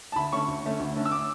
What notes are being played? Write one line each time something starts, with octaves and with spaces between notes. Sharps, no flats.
A5
D2 B5
D3 A3 C#4 C#6
D2
D3 A3 C#4
D2
D3 A3 C#4
E6
D6